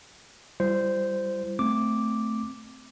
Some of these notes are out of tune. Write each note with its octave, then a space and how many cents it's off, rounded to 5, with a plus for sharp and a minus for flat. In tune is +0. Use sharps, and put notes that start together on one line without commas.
G3 +0 E4 +45 C5 -10
A3 +0 C4 -10 D6 +0